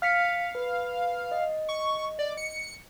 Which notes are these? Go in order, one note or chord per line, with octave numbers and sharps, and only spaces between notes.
F5 F6 B6 C#7
B4
D#5
C#6
D5
C#7